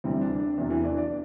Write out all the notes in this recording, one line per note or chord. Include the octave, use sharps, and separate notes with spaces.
D2 C3 E3 G3 C4
D4
D4
E2 C3 F#3 D4
E3 E4
D4 D5
D4 D5